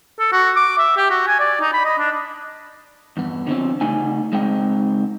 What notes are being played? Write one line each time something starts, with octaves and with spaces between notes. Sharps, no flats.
A4
F#4
D6
E5
G4
F#4
G#5
D5
D#4
B5
D#5
D4
E2 G2 B3
D3 E3 F3 G#3 C4 C#4
C#3 G3 A3 D#4 G#5
C#2 G#3 C4 D#4 G5